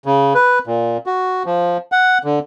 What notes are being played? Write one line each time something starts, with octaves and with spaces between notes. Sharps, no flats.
C#3
B4
A#2
F#4
F3
F#5
D3